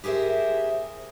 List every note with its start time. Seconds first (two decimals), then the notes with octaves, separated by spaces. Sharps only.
0.04 G4 G#4 A#4 C5 E5